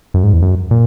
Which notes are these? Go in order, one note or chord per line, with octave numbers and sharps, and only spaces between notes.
F#2
G#2
E2
F#2
A#2